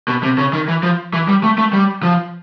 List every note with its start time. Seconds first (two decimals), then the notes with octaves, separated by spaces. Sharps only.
0.08 B2
0.23 C3
0.38 C#3
0.53 D#3
0.68 E3
0.83 F3
1.13 E3
1.28 G3
1.43 A3
1.58 A3
1.73 G3
2.03 F3